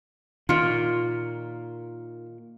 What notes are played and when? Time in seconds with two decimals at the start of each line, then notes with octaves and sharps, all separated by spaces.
0.49 A#2 D#3 F4